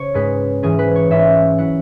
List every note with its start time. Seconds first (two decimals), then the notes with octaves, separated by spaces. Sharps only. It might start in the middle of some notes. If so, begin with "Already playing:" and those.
Already playing: C#3 C#5
0.14 G#2 G#3 C#4 B4
0.63 G#2 E3 C#4 G#4
0.79 B4
0.96 C#5
1.10 G#2 E3 C#4 E5
1.59 F#3 E4 F#5